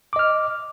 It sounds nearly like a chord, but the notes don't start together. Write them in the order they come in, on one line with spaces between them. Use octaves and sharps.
D6 D#5 F6